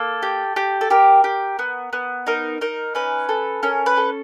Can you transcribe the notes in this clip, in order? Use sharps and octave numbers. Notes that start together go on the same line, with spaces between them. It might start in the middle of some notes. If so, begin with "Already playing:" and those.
Already playing: A#3 A4
G4
G4
A4
G4 A#4
G4
B3
B3
D#4 A#4
D#4 A#4
C#4 B4
A4
C#4 A#4
B4
A4